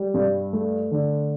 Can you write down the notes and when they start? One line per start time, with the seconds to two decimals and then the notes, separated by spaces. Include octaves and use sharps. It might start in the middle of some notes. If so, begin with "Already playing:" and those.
Already playing: G3
0.14 G2
0.53 A3
0.91 D3